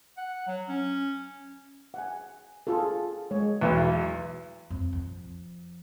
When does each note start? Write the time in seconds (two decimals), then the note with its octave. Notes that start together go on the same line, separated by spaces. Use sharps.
0.17 F#5
0.47 F#3
0.69 C#4
1.94 F#5 G#5
2.67 F4 G#4 A4
3.31 G#3 C#5
3.61 B1 E2
4.70 F2
4.93 F3